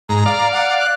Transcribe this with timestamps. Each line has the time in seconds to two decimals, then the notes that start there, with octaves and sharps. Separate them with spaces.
0.09 G#2 A#5
0.26 D5 F5
0.52 F#5
0.79 F#6